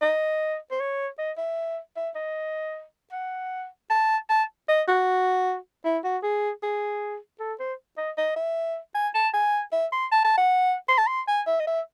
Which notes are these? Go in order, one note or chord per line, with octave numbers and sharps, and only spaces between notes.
D#5
C5
C#5
D#5
E5
E5
D#5
F#5
A5
A5
D#5
F#4
E4
F#4
G#4
G#4
A4
C5
D#5
D#5
E5
G#5
A5
G#5
E5
C6
A5
A5
F#5
C6
A5
C6
G#5
E5
D#5
E5